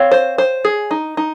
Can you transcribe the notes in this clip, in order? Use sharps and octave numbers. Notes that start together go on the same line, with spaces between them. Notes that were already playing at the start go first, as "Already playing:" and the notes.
Already playing: C4 C#5 F5
C5
C5
G#4
D#4
D#4